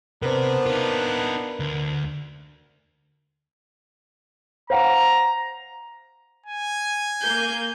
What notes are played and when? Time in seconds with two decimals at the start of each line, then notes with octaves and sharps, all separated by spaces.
0.22 C3 B3 D4 A#4 C5
0.66 D#4 F4 A#4
1.60 D2
4.70 C5 F5 F#5 A#5
6.47 G#5
7.21 A#3 G6